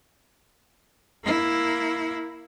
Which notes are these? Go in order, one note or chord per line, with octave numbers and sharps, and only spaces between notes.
A#3 E4